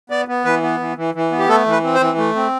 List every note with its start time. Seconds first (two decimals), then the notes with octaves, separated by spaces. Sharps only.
0.10 B3 D5
0.28 B3
0.45 E3 B4
0.63 B3
0.80 E3
0.97 E3
1.14 E3
1.32 B3
1.38 G4
1.49 A3 A4
1.66 E3
1.71 B4
1.83 C4
1.95 C5
2.01 E3
2.18 A3
2.36 C4